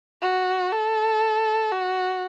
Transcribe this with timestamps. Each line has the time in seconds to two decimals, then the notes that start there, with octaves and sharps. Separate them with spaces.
0.22 F#4
0.72 A4
1.71 F#4